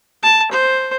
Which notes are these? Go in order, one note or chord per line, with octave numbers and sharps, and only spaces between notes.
A5
C5